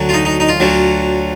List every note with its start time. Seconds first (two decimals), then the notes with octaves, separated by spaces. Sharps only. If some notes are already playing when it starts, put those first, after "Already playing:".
Already playing: D2 D3 F#3
0.09 F4
0.13 D#4
0.25 D#4
0.40 D#4
0.48 F4
0.60 D2 D3 F#3